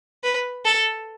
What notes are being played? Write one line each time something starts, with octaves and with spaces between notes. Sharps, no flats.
B4
A4